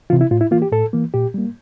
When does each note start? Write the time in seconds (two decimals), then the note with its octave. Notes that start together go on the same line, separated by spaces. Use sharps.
0.10 E3 F4
0.13 C3
0.21 E4
0.31 A2 F4
0.41 E4
0.51 E3 A#3 F4
0.62 G4
0.72 A2 A4
0.93 E3 A#3
1.14 A#2 G4
1.34 G3 A#3